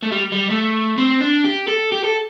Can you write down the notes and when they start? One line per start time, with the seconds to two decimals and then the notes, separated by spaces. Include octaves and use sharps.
0.03 A3
0.12 G3
0.32 G3
0.50 A3
0.98 C4
1.21 D4
1.45 G4
1.68 A4
1.92 G4
2.04 A4